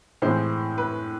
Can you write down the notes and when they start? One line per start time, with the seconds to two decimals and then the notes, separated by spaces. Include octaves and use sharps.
0.22 A2 E3 G#3 C4 C5
0.78 B4